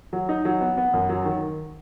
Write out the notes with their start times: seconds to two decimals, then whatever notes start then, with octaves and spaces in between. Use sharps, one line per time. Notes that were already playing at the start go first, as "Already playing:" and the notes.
0.13 F#3
0.29 D#4
0.45 F#3
0.61 B3
0.77 B3
0.93 F#2
1.09 F#3
1.25 D#3